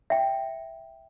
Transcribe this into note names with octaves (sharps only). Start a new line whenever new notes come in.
E5 G5